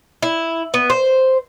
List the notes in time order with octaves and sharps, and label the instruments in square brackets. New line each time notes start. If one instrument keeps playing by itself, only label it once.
[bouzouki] E4
B3
C5